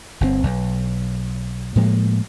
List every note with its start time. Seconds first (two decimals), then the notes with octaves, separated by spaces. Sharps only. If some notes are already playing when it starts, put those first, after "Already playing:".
0.21 G1 C3 C4
0.44 B1
1.76 A2 F3 G#3 A#3